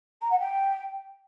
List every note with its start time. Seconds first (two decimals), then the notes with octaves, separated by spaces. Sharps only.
0.21 A#5
0.30 F#5
0.39 G5